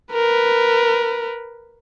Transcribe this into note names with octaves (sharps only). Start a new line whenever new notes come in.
A#4 B4